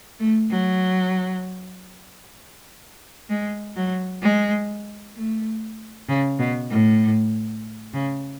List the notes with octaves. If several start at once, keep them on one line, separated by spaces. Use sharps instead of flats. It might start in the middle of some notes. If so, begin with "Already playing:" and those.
A3
F#3
G#3
F#3
G#3
A3
C#3
B2
A2
C#3